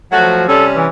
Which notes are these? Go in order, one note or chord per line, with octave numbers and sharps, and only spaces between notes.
F3 F#3 A3 F#4
C3 G3 C#4 A4
E3